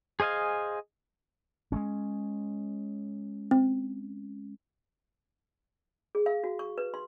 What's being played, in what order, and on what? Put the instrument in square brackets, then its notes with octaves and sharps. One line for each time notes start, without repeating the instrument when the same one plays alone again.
[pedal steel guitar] G#4 C5 D#5 F5 G#5
[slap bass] G#3 A3 C#4
[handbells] C4
[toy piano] G#4
F5
F#4
C#6
B4
C6